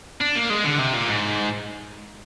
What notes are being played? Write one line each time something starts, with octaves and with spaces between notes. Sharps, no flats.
D4
A#3
G#3
D3
C3
A#2
G#2